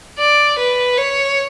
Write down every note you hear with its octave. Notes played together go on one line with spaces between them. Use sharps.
D5
B4
C#5